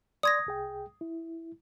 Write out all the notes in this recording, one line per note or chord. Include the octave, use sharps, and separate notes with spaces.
D5 C6 D#6 G#6 A#6
C2 G#4 G5
E4